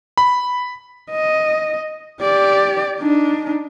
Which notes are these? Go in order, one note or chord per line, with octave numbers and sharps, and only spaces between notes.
B5
D#5
G4 D5
D4 D#4